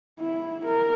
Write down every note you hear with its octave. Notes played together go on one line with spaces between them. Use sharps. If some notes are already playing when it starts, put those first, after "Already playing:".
E4
A#4